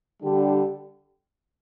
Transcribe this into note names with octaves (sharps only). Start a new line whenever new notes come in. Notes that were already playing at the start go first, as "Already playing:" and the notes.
D3 G3 D4 G4